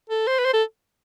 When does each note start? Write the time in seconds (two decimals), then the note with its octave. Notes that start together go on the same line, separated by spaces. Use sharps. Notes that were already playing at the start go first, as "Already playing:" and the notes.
0.10 A4
0.28 C5
0.39 B4
0.45 C5
0.54 A4